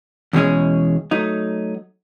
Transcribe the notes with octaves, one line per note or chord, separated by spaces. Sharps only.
E2 B2 G#3 C#4 G#4
F#3 A3 D#4